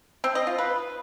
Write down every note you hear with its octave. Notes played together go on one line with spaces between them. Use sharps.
C4
D#5
F4
B4